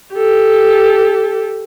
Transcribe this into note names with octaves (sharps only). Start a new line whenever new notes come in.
G4 A4